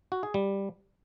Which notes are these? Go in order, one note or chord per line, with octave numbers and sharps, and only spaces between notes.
F#4
G#4
G3